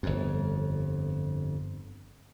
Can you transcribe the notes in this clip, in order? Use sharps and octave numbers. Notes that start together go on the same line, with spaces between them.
G1 F2